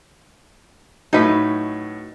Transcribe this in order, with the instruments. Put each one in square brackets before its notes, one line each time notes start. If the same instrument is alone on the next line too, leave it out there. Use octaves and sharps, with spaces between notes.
[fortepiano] A2 F#3 [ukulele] D#4 B4